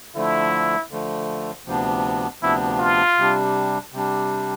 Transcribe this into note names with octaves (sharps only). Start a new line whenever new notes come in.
D3 F3 A3 E4
D3 F3 A3
D2 C3 F3 B3 D4
D2 C3 F3 B3 D4 E4
F4
C3 G3 D4
C3 G3 D4